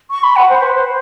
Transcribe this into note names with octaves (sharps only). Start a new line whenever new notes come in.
C#6
B5
F#5
C5
B4
C5